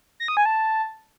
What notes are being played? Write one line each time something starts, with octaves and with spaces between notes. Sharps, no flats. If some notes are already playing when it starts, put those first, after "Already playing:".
A#6
D#6
G#5
A5